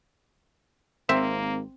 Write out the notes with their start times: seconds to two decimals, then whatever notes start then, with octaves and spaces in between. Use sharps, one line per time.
1.09 G#1 A#3 C4 E5